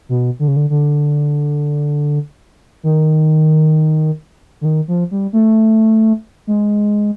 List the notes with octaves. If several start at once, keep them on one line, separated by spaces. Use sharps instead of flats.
B2
D3
C#3
D3
D3
D#3
D3
D#3
F3
G3
A3
G#3